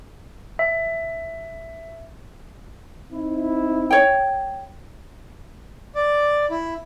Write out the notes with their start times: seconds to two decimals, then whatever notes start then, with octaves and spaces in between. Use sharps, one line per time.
0.59 E5
3.11 C4 D#4 E4
3.91 C#5 G5
5.95 D5
6.50 E4